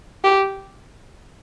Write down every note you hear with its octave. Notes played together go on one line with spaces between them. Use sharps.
G4